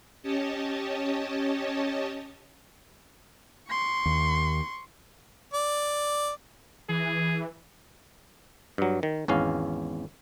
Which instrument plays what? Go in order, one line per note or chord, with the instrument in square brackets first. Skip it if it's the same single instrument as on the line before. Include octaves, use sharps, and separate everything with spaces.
[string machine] C#4 G4 C#5 D#5 A5
[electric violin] C6 C#6
[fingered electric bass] D#2
[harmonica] D5
[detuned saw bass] E3 [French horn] G#4
[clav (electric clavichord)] G2 F#3
D#3
G#1 E2 C#4 F5